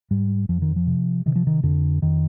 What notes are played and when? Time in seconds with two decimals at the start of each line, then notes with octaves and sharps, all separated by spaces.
0.11 G#2 G3
0.49 F2 F3
0.62 D#3
0.76 F3
0.87 C3
1.26 C3 D#3
1.36 F3
1.47 D#3
1.63 F2 D3
2.02 F2 D#3